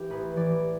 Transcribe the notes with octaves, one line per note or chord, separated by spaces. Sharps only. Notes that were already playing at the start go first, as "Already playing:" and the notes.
Already playing: E3 G4
A1 B4
E3 D5